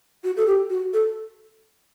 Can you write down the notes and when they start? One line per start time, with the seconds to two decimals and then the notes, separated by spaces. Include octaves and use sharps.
0.24 F#4
0.37 A4
0.47 G4
0.70 F#4
0.93 A4